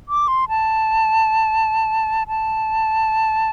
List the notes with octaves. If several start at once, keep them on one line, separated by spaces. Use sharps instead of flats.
D6
C6
A5
A5